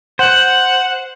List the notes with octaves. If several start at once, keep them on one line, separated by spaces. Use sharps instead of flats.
C5 F#5